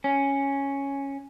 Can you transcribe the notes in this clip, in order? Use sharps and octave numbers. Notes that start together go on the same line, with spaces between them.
C#4